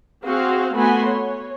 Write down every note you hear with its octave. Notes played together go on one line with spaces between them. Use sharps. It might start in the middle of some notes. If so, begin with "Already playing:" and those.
C4 F#4 G#4 C5 F5
A3 B3 F#4 G#5 B5 C6
C#5